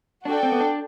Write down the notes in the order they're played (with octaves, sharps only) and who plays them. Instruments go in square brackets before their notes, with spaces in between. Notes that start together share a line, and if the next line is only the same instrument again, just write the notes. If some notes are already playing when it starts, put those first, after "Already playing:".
[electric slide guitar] D4 [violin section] F#4 A4 D5 G5
[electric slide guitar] C4
B3
D4